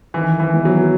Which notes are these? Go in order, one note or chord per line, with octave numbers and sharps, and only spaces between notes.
D#3 E3
E3
G#3 B3 E4 B4
F#3